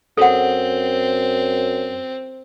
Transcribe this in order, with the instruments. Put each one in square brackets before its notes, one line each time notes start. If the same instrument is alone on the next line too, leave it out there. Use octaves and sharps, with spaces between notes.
[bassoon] F#2 [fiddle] C4 [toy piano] A4 F#5